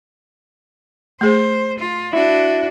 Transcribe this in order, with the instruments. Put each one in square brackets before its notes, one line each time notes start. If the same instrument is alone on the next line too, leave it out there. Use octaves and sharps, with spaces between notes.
[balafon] A3 G#4 [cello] C5
[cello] F4
[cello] D4 F#4 [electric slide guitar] E4